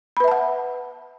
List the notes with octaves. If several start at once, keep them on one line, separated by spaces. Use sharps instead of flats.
B4 E5 F#5 A5 B5